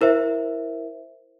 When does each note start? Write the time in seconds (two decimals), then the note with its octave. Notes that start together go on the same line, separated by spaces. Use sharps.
0.01 E4 A#4 C5 E5